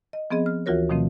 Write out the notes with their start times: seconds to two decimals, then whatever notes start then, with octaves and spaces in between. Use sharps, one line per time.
0.13 D#5
0.31 F3 B3 C4 G#4 D#5
0.46 F6
0.66 D2 E3 F4 F#4 A#4 C#5
0.89 B2 D#3 F3 A3 C4